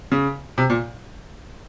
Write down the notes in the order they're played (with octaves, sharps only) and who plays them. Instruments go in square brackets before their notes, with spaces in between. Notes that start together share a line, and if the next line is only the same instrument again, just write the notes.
[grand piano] C#3
C3
A#2